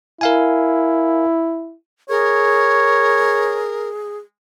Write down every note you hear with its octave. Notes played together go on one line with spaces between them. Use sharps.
E4 A#4 F5 G#5
G#4 A#4 C#5